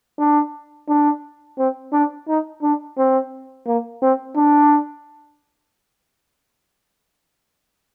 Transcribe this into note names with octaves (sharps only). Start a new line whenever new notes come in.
D4
D4
C4
D4
D#4
D4
C4
A#3
C4
D4